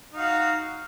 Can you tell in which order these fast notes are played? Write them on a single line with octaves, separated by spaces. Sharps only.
D#4 F5 F#4